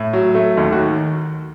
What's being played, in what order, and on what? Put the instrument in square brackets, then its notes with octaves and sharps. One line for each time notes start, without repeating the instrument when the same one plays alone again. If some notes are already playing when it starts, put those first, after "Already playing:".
Already playing: [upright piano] A2
F#3
A3
D#2 D#4
F#4
D#3